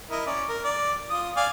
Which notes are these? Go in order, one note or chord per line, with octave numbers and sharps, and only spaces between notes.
E4 A#4 D#5
C#4 D5
A#4
D5
F4 D#6
D5 F5 G#5